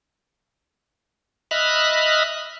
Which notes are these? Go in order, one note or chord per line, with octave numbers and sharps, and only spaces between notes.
D#5 E5 B5 F6 F#6